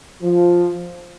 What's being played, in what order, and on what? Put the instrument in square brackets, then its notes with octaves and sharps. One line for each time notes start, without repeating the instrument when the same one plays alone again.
[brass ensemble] F3